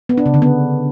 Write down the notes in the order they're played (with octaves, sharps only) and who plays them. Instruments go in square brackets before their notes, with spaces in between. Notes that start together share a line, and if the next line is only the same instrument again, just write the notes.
[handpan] B3
D4
C#3
D3
B3